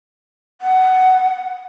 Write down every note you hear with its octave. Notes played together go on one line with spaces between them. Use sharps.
F#5